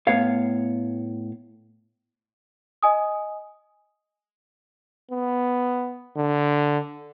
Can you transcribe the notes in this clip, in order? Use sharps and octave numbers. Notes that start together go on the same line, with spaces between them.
A2 B3 C#5 F5
D#5 G#5 D#6
B3
D3